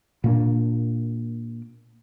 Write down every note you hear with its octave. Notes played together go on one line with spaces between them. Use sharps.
A#2 A#3 D4